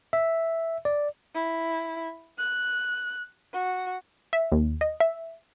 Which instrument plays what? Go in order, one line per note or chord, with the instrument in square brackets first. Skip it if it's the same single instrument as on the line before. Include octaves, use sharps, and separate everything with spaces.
[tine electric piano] E5
D5
[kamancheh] E4
F#6
F#4
[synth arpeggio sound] E5
D#2
D#5
E5